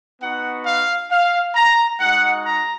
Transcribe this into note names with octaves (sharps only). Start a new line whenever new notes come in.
B3 D#4 F#4 F#5
F5
F5
A#5
G#3 D#4 F#4 F#5
A#5